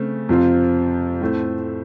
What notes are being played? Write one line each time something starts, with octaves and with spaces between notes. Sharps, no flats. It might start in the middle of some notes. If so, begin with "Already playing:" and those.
Already playing: C#3 A3 C4
F2 C3 F3 C4 F4
A2 A3 C4